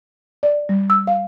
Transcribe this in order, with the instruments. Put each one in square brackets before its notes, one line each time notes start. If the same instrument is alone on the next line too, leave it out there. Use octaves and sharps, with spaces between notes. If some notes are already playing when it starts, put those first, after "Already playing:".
[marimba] D5
G3
E6
F5